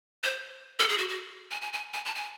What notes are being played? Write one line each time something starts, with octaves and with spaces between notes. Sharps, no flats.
C5
A4
G#4
F#4
F#4
G#5
G#5
G#5
G#5
A5
G#5